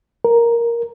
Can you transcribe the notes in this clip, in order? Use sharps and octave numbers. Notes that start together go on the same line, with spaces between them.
A#4